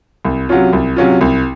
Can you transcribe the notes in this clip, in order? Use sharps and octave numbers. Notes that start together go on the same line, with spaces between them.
C2
C3 F#3 C#4 F4
C2
C3 F#3 C#4 F4
C2